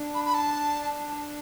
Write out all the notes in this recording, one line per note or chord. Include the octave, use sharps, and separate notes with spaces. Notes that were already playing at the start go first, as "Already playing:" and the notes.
Already playing: D4
B5
B5
A5